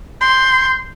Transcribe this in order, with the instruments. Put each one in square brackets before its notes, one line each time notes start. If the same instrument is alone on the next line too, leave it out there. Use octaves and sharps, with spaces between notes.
[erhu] C6 [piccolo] G6